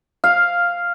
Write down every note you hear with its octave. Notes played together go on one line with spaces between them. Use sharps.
F5